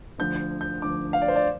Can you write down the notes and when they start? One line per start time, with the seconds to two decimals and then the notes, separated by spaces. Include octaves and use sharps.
0.18 D2 D3 F3 G6
0.61 G6
0.82 D2 D3 F3 D6
1.13 F5
1.22 D5
1.28 C5
1.36 D5